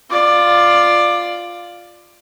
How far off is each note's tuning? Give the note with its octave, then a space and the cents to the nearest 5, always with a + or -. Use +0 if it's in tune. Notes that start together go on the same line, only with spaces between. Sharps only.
F4 +0 D5 +15